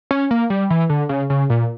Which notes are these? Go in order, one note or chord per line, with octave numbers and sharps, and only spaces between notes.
C#4
A#3
G3
E3
D3
C#3
C#3
A#2